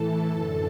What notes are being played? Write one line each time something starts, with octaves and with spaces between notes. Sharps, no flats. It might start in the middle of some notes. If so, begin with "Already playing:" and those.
Already playing: A2 E3 A4 A5
F#2 D3